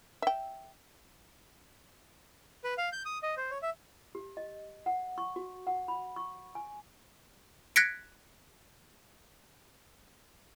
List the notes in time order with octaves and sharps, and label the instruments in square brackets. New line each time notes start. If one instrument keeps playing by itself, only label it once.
[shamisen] E5 G5
[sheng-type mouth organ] B4
F5
G6
D#6
D#5
C5
C#5
E5
[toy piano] G4
D#5
F#5
C#6
F#4
F#5
B5
C#6
G#5
[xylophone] F#6 G#6 A#6 B6 C#7 D7